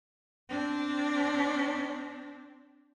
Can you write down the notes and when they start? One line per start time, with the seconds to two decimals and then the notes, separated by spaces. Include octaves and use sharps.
0.49 C4 D4